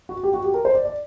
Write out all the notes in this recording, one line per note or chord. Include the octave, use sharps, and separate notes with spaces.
F#4
G4
F#4
G4
A#4
C5
D5
D5